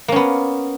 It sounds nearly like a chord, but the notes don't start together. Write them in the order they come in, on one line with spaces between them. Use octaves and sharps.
A#3 C#4 B3